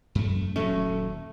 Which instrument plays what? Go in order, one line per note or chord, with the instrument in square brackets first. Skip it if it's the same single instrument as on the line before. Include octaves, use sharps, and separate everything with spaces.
[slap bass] F#2 A3
[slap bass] D#1 F#3 C#4 [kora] A3